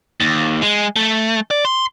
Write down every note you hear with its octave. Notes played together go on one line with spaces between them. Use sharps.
D#2
G#3
A3
D5
C6